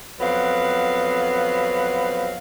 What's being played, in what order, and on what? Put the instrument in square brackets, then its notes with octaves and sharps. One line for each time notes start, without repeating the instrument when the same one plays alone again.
[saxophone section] F2 F#3 B3 F5